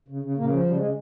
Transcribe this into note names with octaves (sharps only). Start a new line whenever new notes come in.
C#3
C#3
A#2 C#3 A#3
F3
C#3 G3
G#3
C#3